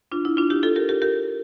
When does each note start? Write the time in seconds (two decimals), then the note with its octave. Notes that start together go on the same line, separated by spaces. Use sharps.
0.12 D4 F4
0.25 E4
0.37 D4 F4
0.50 E4 G4
0.63 F4 A4
0.76 G4 A#4
0.89 G4 A#4
1.02 G4 A#4